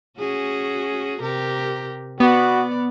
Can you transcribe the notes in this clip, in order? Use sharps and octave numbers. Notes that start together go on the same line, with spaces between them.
C#4 F#4 G#4
C3 G4 A#4
B3 F#4 D5